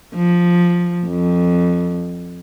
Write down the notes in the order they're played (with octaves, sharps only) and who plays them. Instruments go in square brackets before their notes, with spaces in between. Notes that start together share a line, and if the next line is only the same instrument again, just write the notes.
[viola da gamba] F3
F2